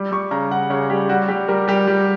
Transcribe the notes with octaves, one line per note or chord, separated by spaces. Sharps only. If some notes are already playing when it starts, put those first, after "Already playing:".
Already playing: G3
G3 C#6
C#3 A#5
C#3 F#5
C#3 C#5
G3 G4
G3 F#4
G3 G4
G3 A#4
G3 G4
G3